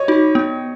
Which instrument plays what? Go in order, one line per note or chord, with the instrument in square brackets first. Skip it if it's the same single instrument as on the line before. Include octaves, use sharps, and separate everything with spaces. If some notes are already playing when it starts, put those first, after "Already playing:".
Already playing: [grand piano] C#5 D#5
[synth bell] D#4 F#4
B3